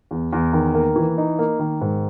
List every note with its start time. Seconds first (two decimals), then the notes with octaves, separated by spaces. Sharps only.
0.11 E2
0.33 E2
0.53 D#3
0.75 A#3
0.96 E3
1.18 D#4
1.39 A#3
1.59 D#3
1.81 G#2